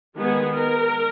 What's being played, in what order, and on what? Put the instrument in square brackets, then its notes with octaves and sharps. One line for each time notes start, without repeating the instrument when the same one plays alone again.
[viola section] D#3 G#3 B3 G#4
A#4